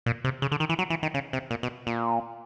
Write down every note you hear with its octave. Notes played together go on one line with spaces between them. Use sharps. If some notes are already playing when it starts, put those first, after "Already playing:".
A#2
C3
C#3
D3
D#3
E3
F#3
E3
D#3
C#3
C3
A#2
B2
A#2